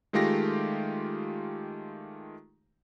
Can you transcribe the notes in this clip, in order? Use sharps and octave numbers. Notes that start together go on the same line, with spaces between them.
D#3 G#3 A3 F4 G4 A#6